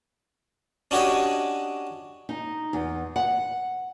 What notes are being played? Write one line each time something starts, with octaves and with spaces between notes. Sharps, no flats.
C#4 D4 F#4 G4 C#5 D#5
D#4
E2
F#5